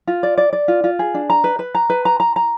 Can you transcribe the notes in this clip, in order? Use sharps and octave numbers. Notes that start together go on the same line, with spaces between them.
F4
D5
D5
D5
F4
F4
G#4
D4
A#5
B4
B4
A#5
B4
A#5
A#5
A#5